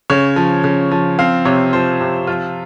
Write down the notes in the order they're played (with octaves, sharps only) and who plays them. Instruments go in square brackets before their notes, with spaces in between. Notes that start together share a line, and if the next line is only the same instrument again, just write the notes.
[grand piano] C#3 C#5
F3
C#3
F3
C4 F5
C3 C#5
F3 C5
C3
F3 F4